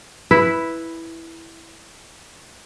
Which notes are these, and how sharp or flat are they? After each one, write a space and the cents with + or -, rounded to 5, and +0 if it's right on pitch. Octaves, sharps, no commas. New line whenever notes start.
E4 +0 B4 +0